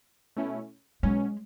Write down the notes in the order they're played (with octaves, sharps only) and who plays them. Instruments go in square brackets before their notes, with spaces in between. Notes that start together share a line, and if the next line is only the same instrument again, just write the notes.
[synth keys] B2 A3 C#4 E4
[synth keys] B2 F#3 C#4 [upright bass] G#3